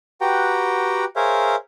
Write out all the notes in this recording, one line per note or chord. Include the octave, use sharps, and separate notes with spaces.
F#4 G4 B4 F#5 G5 A#5
G#4 A#4 C5 C#5 E5 F5